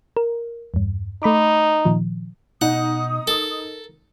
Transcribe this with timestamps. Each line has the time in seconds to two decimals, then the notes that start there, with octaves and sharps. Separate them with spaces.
0.17 A#4
0.74 E2 G2
1.23 A3 D#4 B5 D6
1.85 A#2 D#3 F3
2.61 B2 D#4 F#5 D#6
3.27 A4 A#4